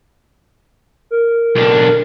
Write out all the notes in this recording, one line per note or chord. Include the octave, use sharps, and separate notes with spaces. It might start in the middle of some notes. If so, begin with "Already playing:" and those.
A#4
B1 D4